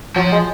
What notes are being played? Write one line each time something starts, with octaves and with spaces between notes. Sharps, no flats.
F3 F#3
G#3